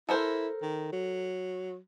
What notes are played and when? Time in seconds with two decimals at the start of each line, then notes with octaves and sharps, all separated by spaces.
0.09 E4 A4 A#4 C5
0.62 D#3
0.93 F#3